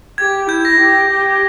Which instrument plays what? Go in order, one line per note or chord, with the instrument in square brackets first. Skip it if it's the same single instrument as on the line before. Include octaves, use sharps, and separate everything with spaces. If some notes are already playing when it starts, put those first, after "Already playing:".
[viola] G4 [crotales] G#6
[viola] E4 [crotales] G6
[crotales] A#6
[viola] G4
G4